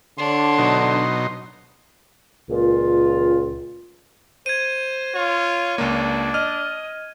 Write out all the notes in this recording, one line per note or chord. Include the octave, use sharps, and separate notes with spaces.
D3 D4 C#5 C6
B2 F#3 D#4
C#2 A#2 F4
C5 G#6 D#7
F4 C#5
C#2 A#3 D4
D#5 F6